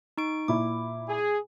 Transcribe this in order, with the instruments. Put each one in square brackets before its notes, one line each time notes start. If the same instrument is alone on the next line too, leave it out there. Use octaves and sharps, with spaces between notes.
[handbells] D#4 C#6 D7
[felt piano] A#2 E4 [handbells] D6
[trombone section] G#4